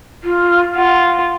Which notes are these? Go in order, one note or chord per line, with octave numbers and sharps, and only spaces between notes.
F4
F4 F#5